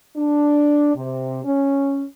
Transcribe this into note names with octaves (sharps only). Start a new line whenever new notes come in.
D4
C3
C#4